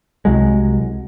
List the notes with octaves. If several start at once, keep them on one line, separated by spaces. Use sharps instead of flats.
C2 F#3 G#3